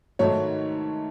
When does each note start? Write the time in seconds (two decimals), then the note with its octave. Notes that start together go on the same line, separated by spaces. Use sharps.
0.19 G#2 D#3 F#3 A3 C#5